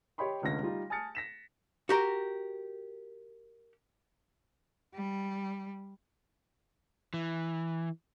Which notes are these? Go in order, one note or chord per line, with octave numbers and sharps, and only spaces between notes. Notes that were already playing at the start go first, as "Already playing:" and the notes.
G4 C#5 D#5 G5 B5 C6
F1 C#2 D3 C#4 A#6
G3 D#4 F4
G#5 A5 D#6 F6 A6 C#7
A#6 B6 E7
F#4 G4 A#4
G3
E3